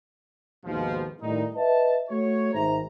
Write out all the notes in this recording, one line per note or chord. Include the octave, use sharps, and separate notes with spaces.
D#2 G#2 B2 F3
A2 D#3 G3 D#4
B4 D#5 E5 A5
A3 F#4 C#5
G#1 C5 E5 A#5